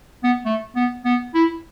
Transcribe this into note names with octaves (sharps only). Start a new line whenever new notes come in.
B3
A3
B3
B3
E4